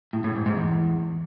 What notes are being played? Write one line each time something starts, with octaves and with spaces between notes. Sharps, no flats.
A2
A2
G#2
G#2
E2